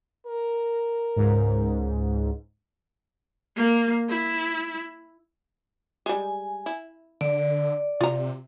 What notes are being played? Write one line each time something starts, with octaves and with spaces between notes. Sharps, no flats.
A#4
C#2 G#2
A#3
E4
G3 G#3 G#5
E4
D3 D5
C3 F4 A#5